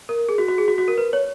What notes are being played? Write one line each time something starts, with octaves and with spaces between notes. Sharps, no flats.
A#4
G#4
F#4
F#4
G#4
F#4
F#4
A#4
B4
C#5